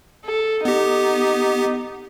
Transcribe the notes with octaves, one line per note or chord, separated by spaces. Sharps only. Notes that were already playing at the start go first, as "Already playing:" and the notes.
A4
B3 D#4 G4